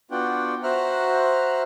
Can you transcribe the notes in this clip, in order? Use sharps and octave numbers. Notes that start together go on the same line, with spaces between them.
B3 D4 F4 F#4 F#5 G5
F#4 C5 E5 A#5 F6 F#6